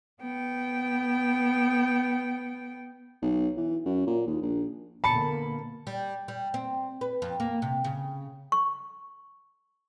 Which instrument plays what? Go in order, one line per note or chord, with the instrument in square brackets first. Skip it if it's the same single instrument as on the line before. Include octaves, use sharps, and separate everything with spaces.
[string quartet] B3 G5
[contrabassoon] B1
E3
F#2
A#2
D#2
A#1
[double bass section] B2 D3 A#3 [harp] A5 C#7 [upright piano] B5
[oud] G3
G3
C4
B4
F2
A#3
C3
C#3
[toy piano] C#6